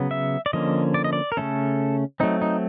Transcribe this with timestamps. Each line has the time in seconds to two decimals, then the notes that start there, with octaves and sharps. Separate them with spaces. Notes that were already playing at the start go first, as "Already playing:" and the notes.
Already playing: C#3 F#3 B3
0.11 E5
0.46 D5
0.53 D3 F3 A#3 C#4 D#5
0.94 D5
1.04 D#5
1.13 D5
1.32 A#4
1.37 C#3 F3 A3 C#4 A4
2.20 F#3 A3 C4 D#4
2.42 D#4